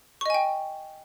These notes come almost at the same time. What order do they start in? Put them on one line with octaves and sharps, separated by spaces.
C#6 D#5 G#5 G5